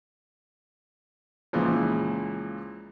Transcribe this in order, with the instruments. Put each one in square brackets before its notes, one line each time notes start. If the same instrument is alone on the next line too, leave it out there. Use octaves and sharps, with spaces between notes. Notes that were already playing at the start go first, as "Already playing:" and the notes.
[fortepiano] C#2 A#2 C#3 E3 F3